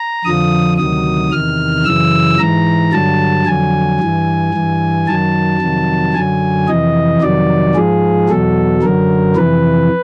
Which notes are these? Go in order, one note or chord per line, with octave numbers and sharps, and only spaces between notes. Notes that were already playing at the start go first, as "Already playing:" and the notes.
Already playing: A#5
F2 D3 F3 D#6
D2 C3 D#3 F#3 D#6
E2 C3 D#3 F6
F#2 C#3 E3 E6
G#2 E3 A#5
G2 D3 F#3 A5
F2 D3 F#3 G#5
G2 E3
G2 E3
F#2 D#3 F#3 A5
F2 C3 D#3 F#3
F#2 D3 F#3 G#5
F2 C3 E3 D#5
F2 C3 D#3 F#3 D5
G#2 F3 G#4
E2 B2 F#3 A4
F#2 D3 F#3 A#4
F2 C3 E3 B4